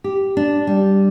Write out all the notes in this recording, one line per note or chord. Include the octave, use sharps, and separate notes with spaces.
G4
D4
G3